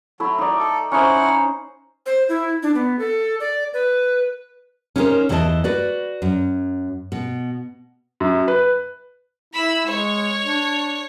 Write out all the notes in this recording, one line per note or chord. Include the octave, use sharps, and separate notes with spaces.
F#3 A3 E4
D#4 D5
A4
C#4 D#4 E4 C5 F#5
C5
E4
D4
B3
A4
D5
B4
C#4 D#4 E4 G4 A#4 C5
E2 E3 E4 C5 D#5 A5
F#4 B4 D5
F#2
B2
F#2
B4
E4 B5 E6
G#3 C#5
D4